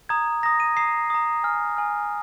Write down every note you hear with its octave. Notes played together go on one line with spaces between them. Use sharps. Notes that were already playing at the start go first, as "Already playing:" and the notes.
A#5 D#6 G#6
A#5 D#6 A#6
D#7
A#5 D#6 C7
A#5 D#6
G#5 F6
G#5 F6